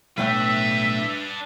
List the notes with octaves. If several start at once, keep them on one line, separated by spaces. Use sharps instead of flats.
B1 A2 D4 B4 E5 G5